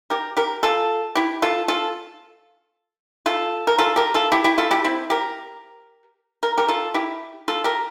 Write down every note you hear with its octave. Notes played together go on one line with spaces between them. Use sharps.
G4 A#4
G4 A#4
F4 A4
E4 G4
F4 A4
F4 A4
F4 A4
A#4
F4 A4
G4 A#4
F4 A4
E4 G4
E4 G4
F4 A4
E4 G4
C4 E4
G4 A#4
A#4
G4 A#4
F4 A4
E4 G4
F4 A4
G4 A#4